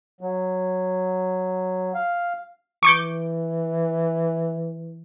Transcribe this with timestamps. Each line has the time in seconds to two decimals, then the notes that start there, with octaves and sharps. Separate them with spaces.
0.21 F#3
1.95 F5
2.83 E3 C#6 D6 G6